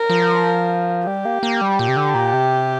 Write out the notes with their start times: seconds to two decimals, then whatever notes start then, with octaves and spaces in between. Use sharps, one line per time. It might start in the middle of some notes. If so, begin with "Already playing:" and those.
Already playing: A#4
0.10 F3
1.07 G3 G4
1.25 A#3
1.43 A#3
1.61 G3
1.79 A#2
1.88 C3
1.97 D3
2.14 A#2
2.33 C3